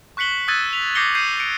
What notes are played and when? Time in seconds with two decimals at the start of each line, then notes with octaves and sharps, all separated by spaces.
0.17 C#6 F#6 B6 C#7 F#7 G7
0.48 D#6 E6 F#6 G#6 A6 D#7
0.73 B6 F7
0.95 D6 G6 A#6 C7 C#7 G7
1.15 G6 C7 D#7
1.40 C#7 D7